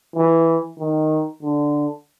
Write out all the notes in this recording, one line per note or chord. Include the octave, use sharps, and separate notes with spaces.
E3
D#3
D3